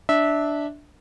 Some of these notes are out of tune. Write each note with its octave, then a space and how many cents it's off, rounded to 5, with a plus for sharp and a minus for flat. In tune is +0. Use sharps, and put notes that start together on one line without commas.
D4 +0 E5 -20